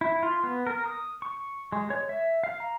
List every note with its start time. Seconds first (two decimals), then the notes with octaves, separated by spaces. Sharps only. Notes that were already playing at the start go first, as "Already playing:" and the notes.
0.01 E4
0.23 F4
0.44 B3
0.67 A#4
0.86 D#6
1.22 C#6
1.72 G#3
1.90 C#5
2.09 E5
2.44 F5
2.60 A#5